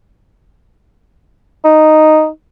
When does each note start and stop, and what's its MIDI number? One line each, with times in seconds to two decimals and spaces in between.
1.65 2.27 63